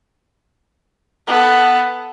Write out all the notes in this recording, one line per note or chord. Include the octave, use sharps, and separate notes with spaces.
B3 A4